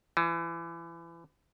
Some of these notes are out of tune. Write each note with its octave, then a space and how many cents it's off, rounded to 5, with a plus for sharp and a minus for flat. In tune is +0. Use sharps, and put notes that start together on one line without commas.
E3 +30